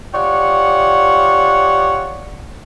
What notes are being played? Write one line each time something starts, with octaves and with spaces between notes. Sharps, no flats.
F4 G4 C#5 D5 F#5